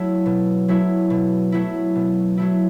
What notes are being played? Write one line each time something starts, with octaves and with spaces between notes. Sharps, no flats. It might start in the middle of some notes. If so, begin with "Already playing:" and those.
Already playing: F#3 A3 E4
B2
F#3 A3 E4
B2
F#3 A3 E4
B2
F#3 A3 E4